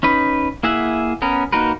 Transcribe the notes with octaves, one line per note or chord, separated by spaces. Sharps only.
C#4 D#4 B4
A#3 E4 G#4 E5 F#5
B3 C#4 A#4
A#3 D#4 F#4 A#4 B4